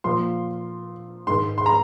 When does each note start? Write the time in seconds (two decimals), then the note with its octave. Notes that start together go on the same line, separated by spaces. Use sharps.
0.04 A#2 F3 C6
1.27 G#2 D#3 C6
1.58 C6
1.66 A#5